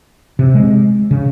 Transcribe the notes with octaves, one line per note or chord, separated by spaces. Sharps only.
C3
G#3
C#3